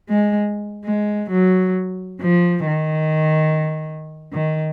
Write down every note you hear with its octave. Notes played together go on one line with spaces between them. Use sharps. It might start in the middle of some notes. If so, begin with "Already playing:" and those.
G#3
G#3
F#3
F3
D#3
D#3